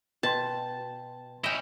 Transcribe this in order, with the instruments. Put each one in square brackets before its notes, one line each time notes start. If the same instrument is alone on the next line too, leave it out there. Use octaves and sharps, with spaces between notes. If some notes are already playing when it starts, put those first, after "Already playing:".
[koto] B2 [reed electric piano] B4 G5 C6 [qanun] A5
[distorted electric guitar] C#4 E4 [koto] D#5 G5